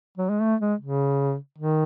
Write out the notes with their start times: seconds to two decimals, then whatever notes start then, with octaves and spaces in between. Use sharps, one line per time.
0.18 F#3
0.29 G#3
0.42 A3
0.61 G#3
0.81 C#3
1.58 D#3